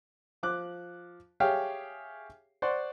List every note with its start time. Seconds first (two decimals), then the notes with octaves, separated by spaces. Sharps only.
0.43 F3 D6 F#6
1.40 G4 G#4 C#5 E5 F5 G5
2.62 C5 D5 F#5 C6 C#6